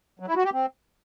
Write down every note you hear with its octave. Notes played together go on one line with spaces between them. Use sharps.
F#3
E4
F#4
G4
C4